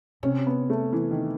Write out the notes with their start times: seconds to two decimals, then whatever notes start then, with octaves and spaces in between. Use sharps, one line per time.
0.23 C3 C#4
0.47 B3
0.70 A3
0.93 E3
1.11 D#3